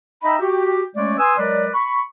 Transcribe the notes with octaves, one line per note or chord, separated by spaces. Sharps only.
D#4 D#5 E5 G5 A#5 B5
F#4 G4
G#3 A3 C#4 C#5 D5
B4 G#5 C6 D#6 E6
F#3 G#3 A#4 B4 D5
B5 C#6